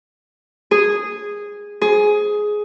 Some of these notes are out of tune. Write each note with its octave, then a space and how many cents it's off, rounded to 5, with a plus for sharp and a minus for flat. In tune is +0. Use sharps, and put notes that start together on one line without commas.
G#4 -10
G#4 +10